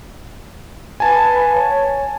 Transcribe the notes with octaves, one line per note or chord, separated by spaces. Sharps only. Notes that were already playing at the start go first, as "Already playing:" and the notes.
B4 F5 G#5 A5
C#5